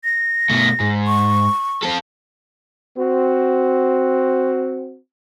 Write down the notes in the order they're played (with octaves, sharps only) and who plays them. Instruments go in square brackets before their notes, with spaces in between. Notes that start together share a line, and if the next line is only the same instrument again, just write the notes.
[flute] A#6
[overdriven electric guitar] B2 A3
G#2
[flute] C#6
[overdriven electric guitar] C4 A4
[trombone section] C4 F#4